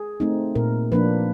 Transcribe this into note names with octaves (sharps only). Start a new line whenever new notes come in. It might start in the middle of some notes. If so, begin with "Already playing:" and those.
Already playing: G#4
A3 C4 D#4
A#2 A#4
F3 A#3 D4 B4